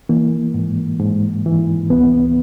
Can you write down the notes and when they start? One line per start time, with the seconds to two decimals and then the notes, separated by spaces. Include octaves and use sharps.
0.09 E3 A#3
0.54 G#2
0.99 G#2
1.46 E3
1.90 C#2 B3